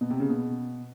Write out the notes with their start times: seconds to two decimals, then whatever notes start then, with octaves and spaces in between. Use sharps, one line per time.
0.01 B2
0.10 C3
0.20 C#3
0.29 B2